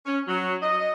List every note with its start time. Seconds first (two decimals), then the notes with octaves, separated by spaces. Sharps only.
0.05 C#4
0.27 F#3
0.62 D#5